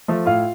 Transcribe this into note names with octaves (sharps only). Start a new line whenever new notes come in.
F3 A3
A2 F4 F5